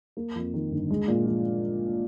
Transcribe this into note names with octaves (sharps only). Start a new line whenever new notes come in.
A#3
F2
D#3
G1
G#3
A#2
F3